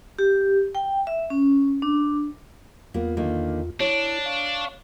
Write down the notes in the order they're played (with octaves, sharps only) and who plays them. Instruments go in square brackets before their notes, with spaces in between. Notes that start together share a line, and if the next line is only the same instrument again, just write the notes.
[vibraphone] G4
G5
E5
C#4
D4
[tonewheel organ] E2 F4 [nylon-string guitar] A#3 B3
[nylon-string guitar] D3 D#3 A#3
[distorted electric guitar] D4 [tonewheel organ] E4 [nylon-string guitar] C#5
[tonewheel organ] F5 C#6